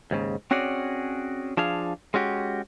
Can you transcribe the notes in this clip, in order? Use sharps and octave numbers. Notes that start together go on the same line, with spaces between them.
D#2 G#2 C#3
C4 C#4 F#4 G#4 C#5 D5
F3 D4 G#4 F5
G#3 C#4 F#4 G4